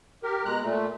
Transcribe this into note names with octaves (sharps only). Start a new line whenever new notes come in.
G4 A#4
B2 G#3 A#5 F#6
A#2 A3